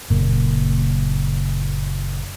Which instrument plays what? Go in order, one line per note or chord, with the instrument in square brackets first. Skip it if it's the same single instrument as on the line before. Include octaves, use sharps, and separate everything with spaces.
[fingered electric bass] F#1 A#2 A#3